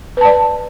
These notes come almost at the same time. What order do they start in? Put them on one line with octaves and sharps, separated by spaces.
B4 A5 D5